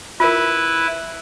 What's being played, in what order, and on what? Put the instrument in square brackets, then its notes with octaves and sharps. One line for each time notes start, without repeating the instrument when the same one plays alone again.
[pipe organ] E4 B4 [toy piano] F4 A#4